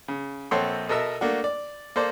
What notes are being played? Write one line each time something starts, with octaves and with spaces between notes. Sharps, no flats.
C#3
A#1 C4 A4 C#5 F#5 C6
B2 A4 A#4 E5 E6
A3 A#3 D4 F#4
D5
A#3 A4 C5 D5